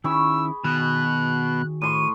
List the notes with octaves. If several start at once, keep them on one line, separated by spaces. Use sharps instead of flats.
D#3 C#4 E4 G#4 B5 C#6 E6
B2 D#3 F#4 F#6
A2 C6 C#6 D#7